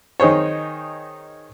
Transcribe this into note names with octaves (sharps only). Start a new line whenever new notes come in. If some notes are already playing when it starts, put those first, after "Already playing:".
D#3 D#4 G#4 C5 C#5